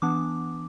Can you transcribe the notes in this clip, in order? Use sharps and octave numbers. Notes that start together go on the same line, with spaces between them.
E3 B3 D4 D6